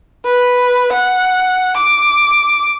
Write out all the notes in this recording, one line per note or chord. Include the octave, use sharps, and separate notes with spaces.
B4
F#5
D6